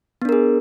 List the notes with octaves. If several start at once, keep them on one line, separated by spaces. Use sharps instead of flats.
B3 D4 G#4 A#4